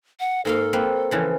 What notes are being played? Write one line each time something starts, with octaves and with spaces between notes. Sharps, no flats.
F#5
G#2 A#3 A4 F5
A#3 C4 B4
C#3 E3 F3